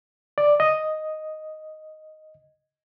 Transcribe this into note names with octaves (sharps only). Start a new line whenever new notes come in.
D5
D#5